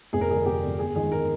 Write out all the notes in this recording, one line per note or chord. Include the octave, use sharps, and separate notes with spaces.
F1 G#4
A#4
F2 D3 G#4
F1 G4
F2 D3
G1 G#4
F2 D#3 G#3 G#4
A#4